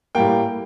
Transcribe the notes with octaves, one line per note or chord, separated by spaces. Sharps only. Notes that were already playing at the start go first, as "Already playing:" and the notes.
A2 G3 A#3 G5